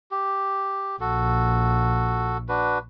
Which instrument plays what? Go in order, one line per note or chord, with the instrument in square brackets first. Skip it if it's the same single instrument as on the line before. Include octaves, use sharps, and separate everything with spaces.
[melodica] G4
[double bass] A#1 [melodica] F#4 A4
[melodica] D4 F#4 B4